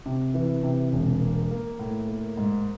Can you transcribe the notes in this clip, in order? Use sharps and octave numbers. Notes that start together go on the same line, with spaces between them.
C3
E3
C3
E1
A#3
A#3
A2
A#3
G#2